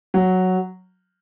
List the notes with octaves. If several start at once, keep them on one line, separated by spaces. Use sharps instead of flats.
F#3